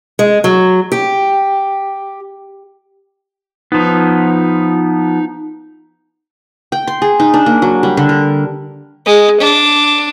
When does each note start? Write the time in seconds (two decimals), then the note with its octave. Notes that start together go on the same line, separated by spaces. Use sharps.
0.19 G#3
0.44 F#3
0.92 G4
3.72 F3 B3 D#4
6.72 G5
6.87 C6
7.02 G#4
7.20 D#4
7.34 D4
7.46 A#3
7.62 F#3
7.83 G3
7.97 D3
8.09 A#4
9.06 G#3
9.40 D4